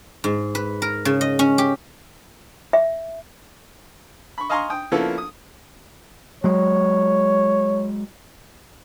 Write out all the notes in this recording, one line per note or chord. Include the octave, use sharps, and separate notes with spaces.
G#2
B4
A#4
C#3
D#5
C#4
G4
E5
B5 C#6
D#5 F5 G#5 A#5 C6 C#6
G5 D#6
F3 A#3 B3 C#4 E4 A4
D#6
F#3 G#3 C#5